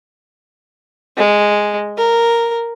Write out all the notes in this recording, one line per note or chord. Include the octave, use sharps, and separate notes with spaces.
G#3
A#4